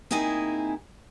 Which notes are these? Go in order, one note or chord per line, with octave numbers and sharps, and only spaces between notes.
A#2 C4 D#4 E4 G#4 G#5